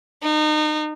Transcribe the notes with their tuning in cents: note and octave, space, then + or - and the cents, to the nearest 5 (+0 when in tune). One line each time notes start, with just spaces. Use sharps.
D#4 -30